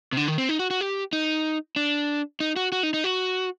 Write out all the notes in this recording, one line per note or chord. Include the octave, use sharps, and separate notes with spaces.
C3
D3
D#3
C4
D#4
F#4
F#4
G4
D#4
D4
D#4
F#4
F#4
D#4
D#4
F#4